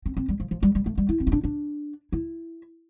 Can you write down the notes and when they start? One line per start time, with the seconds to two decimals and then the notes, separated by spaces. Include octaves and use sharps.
0.06 C4
0.17 C4
0.29 G3
0.40 F3
0.51 F3
0.63 G3
0.75 G3
0.86 A3
0.97 G3
1.09 E4
1.20 C4
1.27 E4
1.32 D4
1.44 D4
2.12 E4